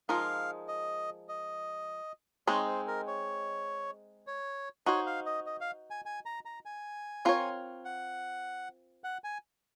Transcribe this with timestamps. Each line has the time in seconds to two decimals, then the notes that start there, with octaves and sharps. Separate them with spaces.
0.09 F3 G#3 D#4 A#4 F5
0.68 D#5
1.29 D#5
2.47 G#3 C4 D#4 C#5
2.67 C5
2.87 A#4
3.07 C#5
4.27 C#5
4.86 D#4 F#4 C5 C#5
5.06 F5
5.26 D#5
5.46 D#5
5.61 F5
5.91 G#5
6.06 G#5
6.26 A#5
6.45 A#5
6.66 G#5
7.25 C4 F4 A#4 C#5
7.85 F#5
9.04 F#5
9.24 G#5